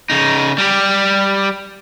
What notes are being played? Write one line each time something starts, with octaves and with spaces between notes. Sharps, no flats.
C#3 D#4
G3 G4